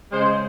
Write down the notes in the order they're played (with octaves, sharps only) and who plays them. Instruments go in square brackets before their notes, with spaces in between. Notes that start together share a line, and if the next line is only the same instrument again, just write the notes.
[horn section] C#3 G#3 C5